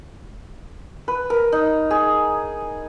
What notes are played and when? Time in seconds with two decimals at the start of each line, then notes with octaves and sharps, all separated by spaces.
1.08 B4
1.30 A#4
1.52 D#4
1.91 G#4